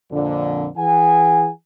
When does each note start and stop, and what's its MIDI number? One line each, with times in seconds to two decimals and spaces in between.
0.11 0.68 41
0.11 0.68 46
0.11 0.68 50
0.77 1.49 52
0.77 1.49 68
0.77 1.49 78
0.77 1.49 80